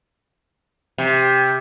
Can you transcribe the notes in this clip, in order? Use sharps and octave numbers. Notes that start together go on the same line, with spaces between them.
C3